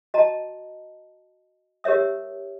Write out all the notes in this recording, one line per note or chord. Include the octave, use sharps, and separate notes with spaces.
F#4 D#5 A5 A#5
G4 A#4 C#5 E5 D#6